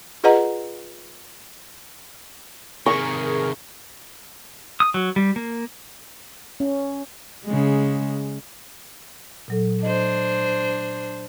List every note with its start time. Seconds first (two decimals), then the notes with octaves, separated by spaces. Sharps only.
0.24 F4 G#4 B4 D#5 F#5 A#5
2.86 C3 D#3 G#4 A#4 C#6
4.80 D#6
4.94 F#3
5.16 G3
5.36 A#3
6.60 C#4
7.45 C#3 G#3
9.48 A#2 F#3 A4
9.83 D4 C5 D#5